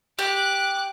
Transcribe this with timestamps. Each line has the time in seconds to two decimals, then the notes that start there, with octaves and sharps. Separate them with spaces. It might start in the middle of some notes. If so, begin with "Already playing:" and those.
0.19 G4 D6 F#6